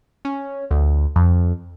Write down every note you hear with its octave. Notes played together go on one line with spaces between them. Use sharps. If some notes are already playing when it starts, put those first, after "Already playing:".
C#4
D2
F2